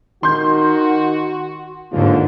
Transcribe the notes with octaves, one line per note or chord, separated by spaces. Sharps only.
D#3 F#4 C6 G6
D#2 G#2 D3 F4